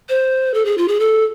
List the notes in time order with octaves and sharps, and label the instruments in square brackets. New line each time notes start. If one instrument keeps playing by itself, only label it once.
[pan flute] C5
A4
G#4
F4
G#4
A4